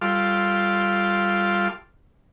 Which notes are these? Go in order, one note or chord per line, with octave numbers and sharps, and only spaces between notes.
G3 F4 A4 F5 C6 D6